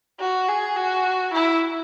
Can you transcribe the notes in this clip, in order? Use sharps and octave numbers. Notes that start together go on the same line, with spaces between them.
F#4
G#4
F#4
E4